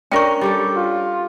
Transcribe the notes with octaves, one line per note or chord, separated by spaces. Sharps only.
C#4 D4 A#4 G5 C#6
G3 G4 A4
F4